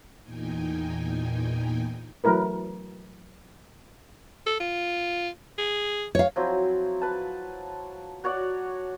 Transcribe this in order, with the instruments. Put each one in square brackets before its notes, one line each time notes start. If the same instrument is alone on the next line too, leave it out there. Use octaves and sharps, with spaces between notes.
[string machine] E2 A#2 D#4 G5 G#5
[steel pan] E3 F#3 A3 E4 A#4 B4
[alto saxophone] A4
F4
G#4
[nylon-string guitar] C#5 F5
[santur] F3 F#3 C4 E4
B4 A5
F#4 C#5 D5 F#5